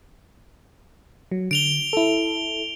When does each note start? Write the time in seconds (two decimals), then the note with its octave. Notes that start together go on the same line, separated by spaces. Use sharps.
1.32 F#3
1.51 D3 D7 F7 G7
1.93 E4 A4